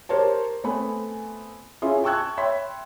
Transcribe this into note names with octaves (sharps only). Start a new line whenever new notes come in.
G4 A#4 C5 C#5 A5
A3 B3 C4 G#5 B5
C#4 E4 F4 G#4
G5 A5 C#6 E6 F#6 G#6
C#5 E5 G5 B5 C6 B6